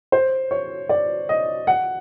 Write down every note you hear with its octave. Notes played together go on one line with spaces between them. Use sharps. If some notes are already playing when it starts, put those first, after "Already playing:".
C5
C#5
D5
D#5
F#5